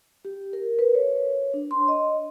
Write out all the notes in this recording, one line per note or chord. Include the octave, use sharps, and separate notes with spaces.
G4
A#4
B4
C#5
D4
C6
D#5